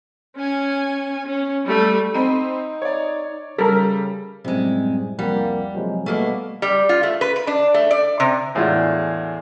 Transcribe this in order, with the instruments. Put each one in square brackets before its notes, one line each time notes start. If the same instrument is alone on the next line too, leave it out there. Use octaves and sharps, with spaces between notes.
[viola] C#4 G#5
C#4
G3 A3
[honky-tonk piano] C4 B5 D#7 [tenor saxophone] D#4
[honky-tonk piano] C#5 D5
[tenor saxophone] C#3 [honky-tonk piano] G3 [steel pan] A4 A#4
[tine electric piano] F#2 A2 G3 [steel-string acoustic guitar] C3 G#3
[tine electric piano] C2 F2 F#5 [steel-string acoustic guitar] G3 [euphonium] A#3
[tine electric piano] C3 F3 F#3 [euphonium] G#3
[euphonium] B2 [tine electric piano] G3 [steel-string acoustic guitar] A3 A#3 D4
[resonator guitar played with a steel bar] G3
F4
A3
B4
B4
D4
A3
D5
C3
[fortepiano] E2 A2 G#3 D4 F4 F#4